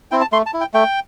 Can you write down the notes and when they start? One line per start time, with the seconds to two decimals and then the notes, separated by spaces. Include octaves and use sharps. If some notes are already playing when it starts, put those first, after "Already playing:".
0.11 C4 E4 G5
0.21 A5
0.32 A3 C6
0.46 A5
0.54 E4
0.61 G5
0.74 A3 G5